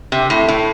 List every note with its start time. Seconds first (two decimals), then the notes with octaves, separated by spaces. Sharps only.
0.12 C3
0.30 A2
0.48 A2